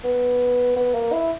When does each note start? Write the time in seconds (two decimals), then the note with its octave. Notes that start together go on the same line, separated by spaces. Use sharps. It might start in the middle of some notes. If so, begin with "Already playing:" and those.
0.04 B3
0.76 B3
0.95 A#3
1.13 E4